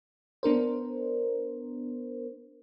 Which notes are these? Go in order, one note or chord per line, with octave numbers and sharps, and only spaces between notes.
B3 D4 A#4 C5